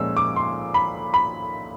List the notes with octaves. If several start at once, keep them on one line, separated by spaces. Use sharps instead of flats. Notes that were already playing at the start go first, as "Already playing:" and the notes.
Already playing: A#2 F3 G#3 C#4 E6
D6
C6
B5
B5